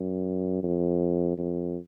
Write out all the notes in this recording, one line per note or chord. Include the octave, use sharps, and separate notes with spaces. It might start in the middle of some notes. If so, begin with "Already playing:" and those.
Already playing: F#2
F2
F2